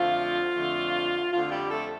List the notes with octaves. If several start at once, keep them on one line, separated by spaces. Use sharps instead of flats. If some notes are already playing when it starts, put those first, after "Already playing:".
Already playing: F2 D3 F3 A3 F4
F2 D3 F3 A3
F2 D3 F3 A3 F4
G3 G4
A3 A4